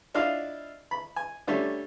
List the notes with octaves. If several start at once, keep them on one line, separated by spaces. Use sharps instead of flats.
D4 E4 F4 D#5 F5
B5
G#5
D3 G3 A3 C#4